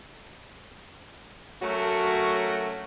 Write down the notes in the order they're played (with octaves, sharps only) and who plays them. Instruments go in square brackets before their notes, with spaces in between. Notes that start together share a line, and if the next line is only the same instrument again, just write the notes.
[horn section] F#3 A3 C#4 F#4 A#4